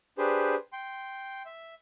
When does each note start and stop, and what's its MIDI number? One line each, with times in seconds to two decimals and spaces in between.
0.18 0.55 62
0.18 0.55 67
0.18 0.55 68
0.18 0.55 71
0.18 0.55 72
0.73 1.42 79
0.73 1.42 84
1.46 1.75 76